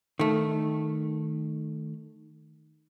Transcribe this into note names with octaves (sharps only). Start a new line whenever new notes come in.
D#3 A3